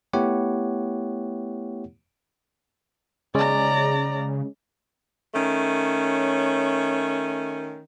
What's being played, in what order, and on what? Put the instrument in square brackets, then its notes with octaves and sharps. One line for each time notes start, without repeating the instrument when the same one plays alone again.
[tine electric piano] A3 B3 E4 G4 C#5 F#5
[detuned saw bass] C#3 [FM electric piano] G#3 C#4 [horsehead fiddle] D5 A#5
[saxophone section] D#3 A3 C#4